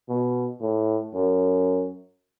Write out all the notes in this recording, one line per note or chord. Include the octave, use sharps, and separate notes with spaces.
B2
A2
F#2